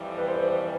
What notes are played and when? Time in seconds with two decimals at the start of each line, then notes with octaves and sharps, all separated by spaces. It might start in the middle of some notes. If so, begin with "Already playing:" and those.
Already playing: F2 E3 G3
0.18 B4
0.28 C5
0.38 B4
0.49 B4
0.60 C5